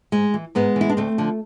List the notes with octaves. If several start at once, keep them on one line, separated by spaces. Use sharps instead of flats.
G#2 G#3
E3
G#2 G#3 B3
E3 E4
D4
D2 A3 C4
D3 F3